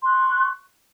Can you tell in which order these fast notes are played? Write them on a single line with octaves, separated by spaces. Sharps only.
C6 F#6 C#6